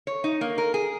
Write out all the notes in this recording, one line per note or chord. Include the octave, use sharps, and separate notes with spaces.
C#5
D#4
A#3
A#4
G#4